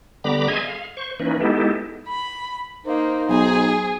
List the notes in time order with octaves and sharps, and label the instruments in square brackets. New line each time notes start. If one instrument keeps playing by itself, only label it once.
[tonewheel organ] D3 G3 B3 A#5 B5 D6
G#4 D#5 E5 G#5 C6 G#6
F5
C5 C#6
E3 A#3 C#4 D#4 B4
G#3 B3 D#4 E4 G4 A4
[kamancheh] B5
[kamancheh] A#3 [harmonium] D#4 C5
[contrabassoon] B1 [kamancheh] G#4